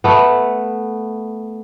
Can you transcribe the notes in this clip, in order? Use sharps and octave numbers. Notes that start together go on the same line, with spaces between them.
A3 B3